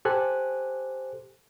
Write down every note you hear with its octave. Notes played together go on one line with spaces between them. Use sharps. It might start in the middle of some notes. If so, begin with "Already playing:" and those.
G4 A4 C5 G#5 F#6